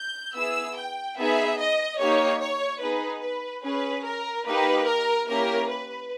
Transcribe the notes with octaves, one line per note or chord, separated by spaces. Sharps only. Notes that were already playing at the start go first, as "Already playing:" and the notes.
Already playing: G6
B3 E4 G#4 E6
G5
B3 D#4 G#4 E5
D#5
A#3 D#4 G4 C#5
C#5
B3 D#4 G#4 B4
B4
C#4 G#4 B4
A#4
A#3 D#4 G4 B4
A#4
A#3 C#4 E4 G4 A#4
B4